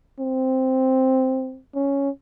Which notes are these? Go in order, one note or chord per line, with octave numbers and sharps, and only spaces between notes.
C4
C#4